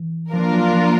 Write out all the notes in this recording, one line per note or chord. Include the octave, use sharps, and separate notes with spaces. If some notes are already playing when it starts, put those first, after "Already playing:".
Already playing: E3
F3 A#3 D4 F4 A#4
F#3
F3